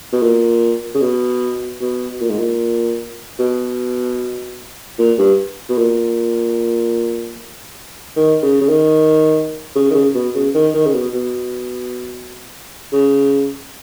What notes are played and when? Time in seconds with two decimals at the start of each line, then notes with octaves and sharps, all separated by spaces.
0.12 B2
0.22 A#2
0.95 C#3
1.01 B2
1.81 B2
2.20 A#2
2.29 G#2
2.38 A#2
3.39 B2
4.99 A#2
5.18 G2
5.69 B2
5.78 A#2
8.16 D#3
8.42 C#3
8.61 C#3
8.69 D#3
9.75 C#3
9.90 D#3
9.94 C#3
10.15 B2
10.35 C#3
10.54 D#3
10.74 D#3
10.86 C#3
10.94 B2
11.14 B2
12.93 C#3